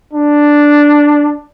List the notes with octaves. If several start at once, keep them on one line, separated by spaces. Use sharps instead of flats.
D4